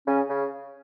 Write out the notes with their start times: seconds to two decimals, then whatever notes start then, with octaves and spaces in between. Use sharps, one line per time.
0.07 C#3 C#4
0.30 C#3